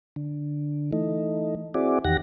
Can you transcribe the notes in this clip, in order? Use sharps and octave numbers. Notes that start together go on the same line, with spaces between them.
D3
E3 A3 D#4
C4 E4 F#4 G#4 D5
E2 D#3 G4 F#5 A#6